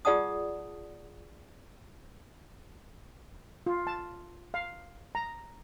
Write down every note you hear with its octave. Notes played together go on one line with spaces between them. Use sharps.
F4 G#4 D5 F#5 A5 D#6
F4
A5
F5
A#5